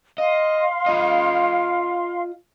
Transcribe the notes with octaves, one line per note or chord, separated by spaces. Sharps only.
D#5 F5 C6
F4 D#5